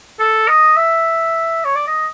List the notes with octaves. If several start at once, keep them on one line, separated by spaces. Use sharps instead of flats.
A4
D#5
E5
C#5
D5
D#5